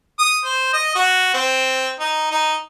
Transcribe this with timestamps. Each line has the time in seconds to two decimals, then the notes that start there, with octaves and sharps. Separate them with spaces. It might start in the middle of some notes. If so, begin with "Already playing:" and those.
0.19 D#6
0.45 C5
0.73 D#5
0.96 F#4
1.34 C4
2.00 D#4
2.32 D#4